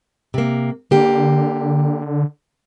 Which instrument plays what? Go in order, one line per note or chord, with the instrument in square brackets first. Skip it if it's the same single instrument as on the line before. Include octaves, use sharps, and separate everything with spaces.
[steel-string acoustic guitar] C3 A#3
[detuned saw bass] D3 [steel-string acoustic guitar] A#3 G4